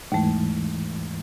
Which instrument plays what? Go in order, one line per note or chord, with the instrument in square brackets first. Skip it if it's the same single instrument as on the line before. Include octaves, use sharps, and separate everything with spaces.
[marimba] D#2 A3 [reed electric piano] G#2 E3